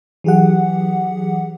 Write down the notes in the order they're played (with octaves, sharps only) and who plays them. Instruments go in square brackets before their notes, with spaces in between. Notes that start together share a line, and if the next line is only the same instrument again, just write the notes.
[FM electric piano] E3 F#3 G4 G#4 F#5